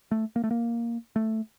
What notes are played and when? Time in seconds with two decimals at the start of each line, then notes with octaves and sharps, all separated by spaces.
0.11 A3
0.36 A#3
0.44 A3
0.51 A#3
1.16 A3